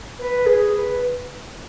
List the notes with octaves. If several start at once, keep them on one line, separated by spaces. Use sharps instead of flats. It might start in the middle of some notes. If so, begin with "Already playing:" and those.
B4
G#4
B4